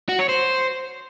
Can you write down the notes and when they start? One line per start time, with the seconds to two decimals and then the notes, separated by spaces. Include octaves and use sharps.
0.09 F#4
0.19 C#5
0.29 C5